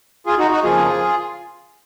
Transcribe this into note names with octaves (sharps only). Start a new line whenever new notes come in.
F4 G#4
D#4 F#4
D#4 F#4
F2 C#3 F3 A#3 F4 G#4